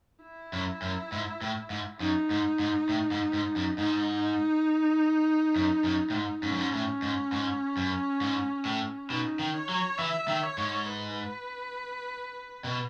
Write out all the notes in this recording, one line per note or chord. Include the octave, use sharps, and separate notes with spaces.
E4
F#2
F#2
G#2
A2
G#2
F#2 D#4
G#2
G#2
A2
G#2
G#2
F#2
G#2 D#4
F#2
F#2
A2
G#2
G#2 C#4
F#2
G#2
A2
G#2
G#2
F#2
G#2
A2
B2 D#4
D#3
C#5
F#3
E3 E5
D#3
C#5
G#2
B4
B2